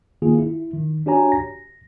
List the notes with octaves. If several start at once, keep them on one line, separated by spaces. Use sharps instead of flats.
D#3 A#3 F4 G#4
E4
D#3
D4 F#4 G4 C#5 G#5 A#5
A#6